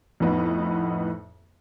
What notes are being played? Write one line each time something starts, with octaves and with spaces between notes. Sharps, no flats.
F2 A2 B3 D#4